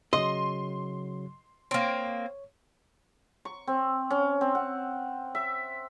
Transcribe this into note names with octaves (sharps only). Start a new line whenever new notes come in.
C#3 F#3 D#5 C6
A#3 C4 C#5
C#6
C4
C#4
C4
F#5
E5